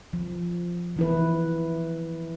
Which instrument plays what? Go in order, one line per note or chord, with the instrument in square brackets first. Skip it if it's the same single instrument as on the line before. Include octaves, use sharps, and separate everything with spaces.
[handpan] F3
E3 E4 B4